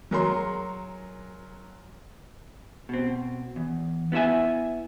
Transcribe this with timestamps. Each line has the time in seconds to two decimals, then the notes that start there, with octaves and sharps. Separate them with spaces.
0.11 F#3 G#4 A#4 C#5 A#5 C6
2.89 B2 C4
3.56 E2
4.12 B3 E4 G4 E5 G#5